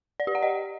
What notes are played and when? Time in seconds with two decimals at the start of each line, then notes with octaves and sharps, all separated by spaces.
0.20 D5
0.27 G4
0.35 F#5
0.43 D#5